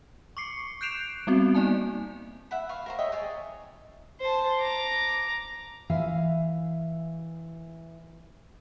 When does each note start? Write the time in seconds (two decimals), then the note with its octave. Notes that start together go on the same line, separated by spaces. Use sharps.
0.37 C#6 D6 C7 C#7
0.81 F#6 G6 C7 D7 E7 F7
1.27 G3 B3 C4 F#4
1.55 A#3 D#4 D5 G#5 A5
2.51 E5 F#5 B5
2.69 B4 F5 C#6
2.86 A#4 C5 A#5
2.99 C#5 D#5 E5 G5
3.12 G#4 C#5 D5
4.20 C5 A5
4.61 A#5 D6
5.90 E3 E5 F5